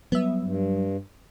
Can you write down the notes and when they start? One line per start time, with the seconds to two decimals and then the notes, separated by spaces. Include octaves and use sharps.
0.12 F#3 G3 B3 E5
0.42 G2